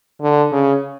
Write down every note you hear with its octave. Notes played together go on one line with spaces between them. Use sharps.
D3
C#3